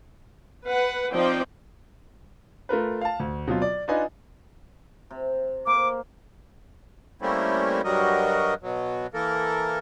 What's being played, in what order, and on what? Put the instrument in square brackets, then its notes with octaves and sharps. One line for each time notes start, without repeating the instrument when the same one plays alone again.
[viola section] B4 F#5
F3 C4 D#4 C5 D5 G5
[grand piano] A3 F4 A#4 B4
F5 A5
D2
B2 F#3 C4 F4
D5
D4 D#4 F4 B4 D#5 G#5
[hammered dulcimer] C3
[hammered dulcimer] A#3 C5 [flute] D6
[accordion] G3 A3 A#3 C4 C#4 E4
G2 F#3 G3 F#4 A#4 D#5
B2 F#3
E3 A#3 A4 A#4